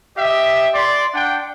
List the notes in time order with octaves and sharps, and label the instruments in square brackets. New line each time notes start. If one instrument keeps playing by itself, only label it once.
[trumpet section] G4 D#5 E5
D5 C6
D4 F#5 G5